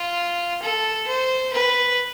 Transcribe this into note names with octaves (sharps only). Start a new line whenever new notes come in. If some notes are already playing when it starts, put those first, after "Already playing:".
Already playing: F4
A4
C5
B4